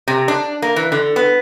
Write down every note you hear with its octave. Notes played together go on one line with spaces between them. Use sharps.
C3
D4
A#3
E3
D3
B3